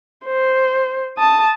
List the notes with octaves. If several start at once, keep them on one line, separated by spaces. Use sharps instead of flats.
C5
A5 D#6